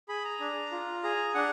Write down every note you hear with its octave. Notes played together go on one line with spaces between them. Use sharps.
G#4 B5
A#5
D4
F4
G#4 A#5
D4 F#5